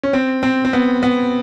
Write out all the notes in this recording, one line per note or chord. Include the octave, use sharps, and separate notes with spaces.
C#4
C4
C4
C4
B3
B3